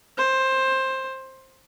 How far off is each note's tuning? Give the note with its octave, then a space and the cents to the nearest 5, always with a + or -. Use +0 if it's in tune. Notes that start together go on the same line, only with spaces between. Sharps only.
C5 +15